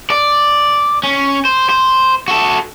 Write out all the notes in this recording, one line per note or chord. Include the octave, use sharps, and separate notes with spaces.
D5
C#4
C5
C5
F#4 A4